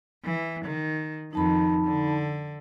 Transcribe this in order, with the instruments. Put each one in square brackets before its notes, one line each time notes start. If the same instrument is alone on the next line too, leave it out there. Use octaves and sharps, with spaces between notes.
[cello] E3
D#3
[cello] F2 D#3 [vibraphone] D#4 A5 B5
[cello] D3